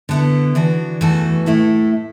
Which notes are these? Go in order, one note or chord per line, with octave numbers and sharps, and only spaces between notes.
D3 B3 E4 A4
E3 D4 F#4
E2 E3 A3 F#4 A4
A2 A3 E4 A4